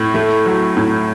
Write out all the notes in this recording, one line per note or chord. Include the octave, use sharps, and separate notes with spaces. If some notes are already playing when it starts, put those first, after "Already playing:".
Already playing: A2
A3
F#3
A2